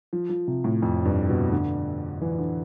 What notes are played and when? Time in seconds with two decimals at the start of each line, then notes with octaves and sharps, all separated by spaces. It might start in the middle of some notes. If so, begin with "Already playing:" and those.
0.13 F3
0.30 F3
0.48 C3
0.64 A2
0.82 F2
1.05 G2
1.29 B2
1.52 D3
2.21 E3
2.39 D3